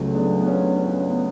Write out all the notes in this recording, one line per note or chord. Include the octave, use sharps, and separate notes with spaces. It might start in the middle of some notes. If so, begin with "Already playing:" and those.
Already playing: C#2 C#3 F#3 A3
B3 D4
B3
C#4
C#4
B3
B3